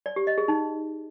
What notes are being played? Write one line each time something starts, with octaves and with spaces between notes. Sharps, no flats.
D5
G4
D#5
G#4
D#4